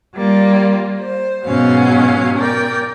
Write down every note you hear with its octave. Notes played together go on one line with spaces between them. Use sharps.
G3 A#3 F4
C5
G#2 B2 F#3 C#4 F5
A#4 D5 G5